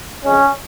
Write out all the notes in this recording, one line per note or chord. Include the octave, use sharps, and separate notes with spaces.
F2 C#3 G#3 C#4